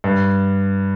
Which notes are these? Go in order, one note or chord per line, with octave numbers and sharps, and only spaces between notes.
G2